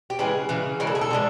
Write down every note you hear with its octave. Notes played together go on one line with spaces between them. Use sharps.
G4
C#3 E3 G#3 G#4
C#3 E3 G#3
C#3 E3 G#3 A#4
A4
G#4
A4
D3 F3 G#3